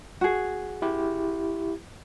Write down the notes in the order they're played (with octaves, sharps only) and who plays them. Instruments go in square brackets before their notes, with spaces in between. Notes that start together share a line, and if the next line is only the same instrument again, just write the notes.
[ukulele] F#4 G#4
[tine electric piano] E4 G4